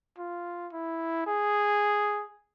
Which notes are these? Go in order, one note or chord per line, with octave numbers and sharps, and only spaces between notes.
F4
E4
G#4